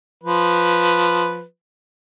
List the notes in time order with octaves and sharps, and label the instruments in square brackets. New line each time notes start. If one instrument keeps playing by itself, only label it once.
[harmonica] F3 B4